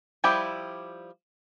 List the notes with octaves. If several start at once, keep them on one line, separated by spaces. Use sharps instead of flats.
F3 G3 E4 G4